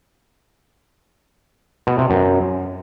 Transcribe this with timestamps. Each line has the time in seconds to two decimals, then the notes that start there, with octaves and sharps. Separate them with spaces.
1.87 B2
1.98 C3
2.10 F#2